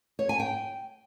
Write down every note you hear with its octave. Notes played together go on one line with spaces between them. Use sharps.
C#5
G#5
G5